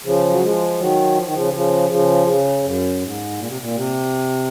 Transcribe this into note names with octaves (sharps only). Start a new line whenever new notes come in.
C#3 F3
F#3
F3 G#3
D#3 F#3
F3
D#3
C#3 F3
C#3 F3
C#3 F3
C#3
F#2
G#2
A#2
C3
A#2
C3